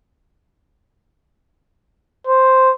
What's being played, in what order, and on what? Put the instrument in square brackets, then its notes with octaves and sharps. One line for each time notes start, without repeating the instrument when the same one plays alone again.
[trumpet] C5